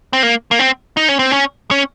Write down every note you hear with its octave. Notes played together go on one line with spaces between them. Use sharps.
C4
A#3
A#3
C4
D#4
C#4
C4
C#4
C#4